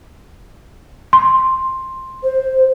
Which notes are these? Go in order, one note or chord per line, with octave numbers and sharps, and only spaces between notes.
C6
C5